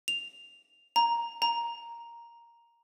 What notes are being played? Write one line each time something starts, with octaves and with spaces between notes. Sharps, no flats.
F7
A#5
A#5